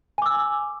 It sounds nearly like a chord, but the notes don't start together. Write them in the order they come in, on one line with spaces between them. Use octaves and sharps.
G#5 D6 E6